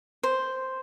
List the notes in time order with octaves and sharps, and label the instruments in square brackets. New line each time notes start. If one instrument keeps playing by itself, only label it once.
[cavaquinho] C5